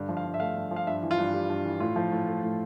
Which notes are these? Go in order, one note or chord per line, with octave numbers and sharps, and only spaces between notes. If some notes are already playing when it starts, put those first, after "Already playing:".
Already playing: G2 D3
F3
F5
G2
E5
A3 F5
G2
F3
F5
G2 E5
E3
F4
G2
G3
G2
E3
A2 F4
F3
A2
A3
A2